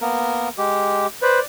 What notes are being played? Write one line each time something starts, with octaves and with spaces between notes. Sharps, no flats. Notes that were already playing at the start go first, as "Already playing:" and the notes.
A#3 B3 A#4
G#3 G4
B4 C5 D5